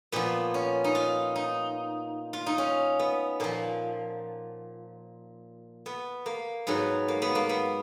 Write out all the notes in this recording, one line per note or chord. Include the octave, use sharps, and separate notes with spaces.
A#2 F3 B3
C#4
D#4
F4
D#4
F4
D#4
C#4
B3
A#2 F3 A#3
B3
A#3
G#2 F#3 B3
A#3
B3
A#3
B3